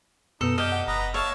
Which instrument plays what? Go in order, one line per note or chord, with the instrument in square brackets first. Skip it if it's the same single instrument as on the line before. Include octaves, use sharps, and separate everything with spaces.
[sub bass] F#2 [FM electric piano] B2 B3 [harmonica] D#4 [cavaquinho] A4
[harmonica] G4 [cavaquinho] D#5 [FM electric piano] F6 G6
[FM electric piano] F#5
[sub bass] F#1 [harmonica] B4 A#5 D#6
[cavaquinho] C#5 [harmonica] E5 F5 A5